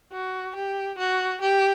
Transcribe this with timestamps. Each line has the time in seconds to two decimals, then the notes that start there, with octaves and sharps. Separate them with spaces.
0.12 F#4
0.55 G4
0.98 F#4
1.41 G4